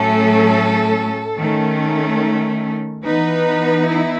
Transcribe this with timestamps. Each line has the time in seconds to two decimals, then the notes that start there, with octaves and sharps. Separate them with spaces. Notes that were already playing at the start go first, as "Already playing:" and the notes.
Already playing: A2 F#3 A3 C#4 A4
1.37 D#3 A3 C#4
3.03 E3 B3 D#4 B4
3.88 E4